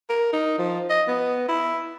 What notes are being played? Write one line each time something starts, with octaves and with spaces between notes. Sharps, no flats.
A#4
D#4
F3
D#5
B3
E4